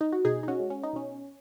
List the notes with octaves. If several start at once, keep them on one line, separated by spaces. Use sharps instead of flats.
D#4
F#4
B2 D#4 G#4
D#4
C#4 F#4
G#3
C#4
D#4
B2 C#4